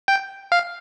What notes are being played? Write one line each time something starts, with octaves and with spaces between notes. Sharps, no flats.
G5
F5